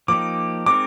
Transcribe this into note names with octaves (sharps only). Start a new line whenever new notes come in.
F3 A#3 D#4 G4 D6
G#3 C4 D#4 A#4 D6